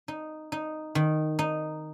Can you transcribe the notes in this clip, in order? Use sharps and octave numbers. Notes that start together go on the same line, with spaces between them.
D#4
D#4
D#3
D#4